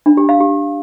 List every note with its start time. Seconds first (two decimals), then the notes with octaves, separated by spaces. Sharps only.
0.06 D4
0.17 G4
0.29 F5
0.40 G4